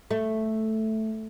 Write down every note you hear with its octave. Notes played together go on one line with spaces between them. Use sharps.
A3